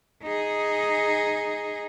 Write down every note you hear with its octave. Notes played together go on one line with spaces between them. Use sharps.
D#4 G#4